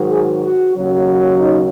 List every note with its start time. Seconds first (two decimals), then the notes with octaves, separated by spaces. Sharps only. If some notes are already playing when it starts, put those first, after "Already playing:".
Already playing: G#2 D#3 F#3
0.11 G#4
0.44 F#4
0.76 D#2 C#3 F#3
1.40 D#4